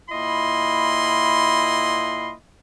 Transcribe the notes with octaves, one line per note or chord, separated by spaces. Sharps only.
A#2 E4 D#5 B5 C6